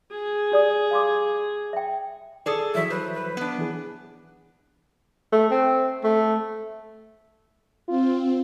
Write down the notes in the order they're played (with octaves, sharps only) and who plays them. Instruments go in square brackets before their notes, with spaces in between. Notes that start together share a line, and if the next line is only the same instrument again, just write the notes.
[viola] G#4
[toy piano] G4 D5 D#6
F5 C6 D6
E5 G5
[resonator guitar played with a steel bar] G#4 A4 [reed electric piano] D5 D#6
[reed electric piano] E3 F#3 C#5 [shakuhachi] E5
[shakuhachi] B4 [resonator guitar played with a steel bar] C5
[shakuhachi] B4
[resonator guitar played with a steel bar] B3 D4
[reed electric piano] E3 G#4
[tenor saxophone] A3
C4
A3
[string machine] C4 [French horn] F4